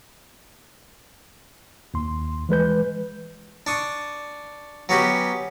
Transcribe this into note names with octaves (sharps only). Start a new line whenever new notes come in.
D#2 C6
E3 G#3 B4 G6
D4 C#6 D#6
F#3 B3 C#4 F#4 G4